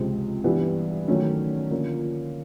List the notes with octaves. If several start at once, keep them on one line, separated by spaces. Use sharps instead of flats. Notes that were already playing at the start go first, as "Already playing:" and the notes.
Already playing: C#2 C3 F3 G#3 C4
G2 E3 G3 B3
D#3 F#3 A3 C#4
D3 F3 A#3 C#4 F4